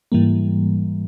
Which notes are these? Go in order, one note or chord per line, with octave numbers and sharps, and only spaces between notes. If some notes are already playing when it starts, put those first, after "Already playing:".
G#2 E3 G3 A#3